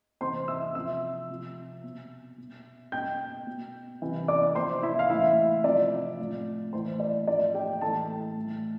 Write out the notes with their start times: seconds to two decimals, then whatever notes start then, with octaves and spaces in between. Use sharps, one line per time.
0.21 C3 E3 C5 C6
0.48 E5 E6
0.75 C3 F3 E5 E6
1.30 C3 F3
1.83 B2
2.38 B2
2.92 B2 G5 G6
3.47 B2
4.02 C3 E3
4.28 D5 D6
4.55 C3 F3 C5 C6
4.83 E4 E5
4.99 F5
5.10 A2 E3 E4 E5
5.64 C3 F3 D5
6.19 A2 F3
6.73 A2 E3 C5
7.00 D5
7.27 A2 F3 D5
7.54 G4 G5
7.73 G5
7.81 A2 E3 A4 A5
8.36 A2 E3